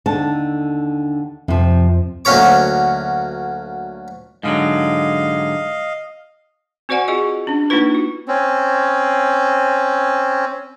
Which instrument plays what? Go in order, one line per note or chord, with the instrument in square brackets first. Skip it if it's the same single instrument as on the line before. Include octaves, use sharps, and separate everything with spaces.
[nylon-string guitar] D#2 D3 A5
[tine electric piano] F2 [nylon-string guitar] C3 F3
[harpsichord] D2 F#3 A#3 C#4 C#5 D6
[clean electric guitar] G#2 D3 F#3 [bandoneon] D#5 F5
[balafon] C4 F#4 C5 D5 F#5 G#5
F4 F#4 G#4 D#5
C#4 D4
A#3 D4 D#4 F4 B4
F#4
[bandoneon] C4 C#4